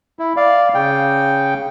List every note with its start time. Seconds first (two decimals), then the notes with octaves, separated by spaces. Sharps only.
0.19 E4
0.36 D5 F5
0.74 C#3 G5